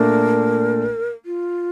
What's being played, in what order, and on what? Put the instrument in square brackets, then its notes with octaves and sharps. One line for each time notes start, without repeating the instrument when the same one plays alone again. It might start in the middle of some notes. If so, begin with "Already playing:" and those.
Already playing: [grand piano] A#2 A3 D4 [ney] A#4
[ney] F4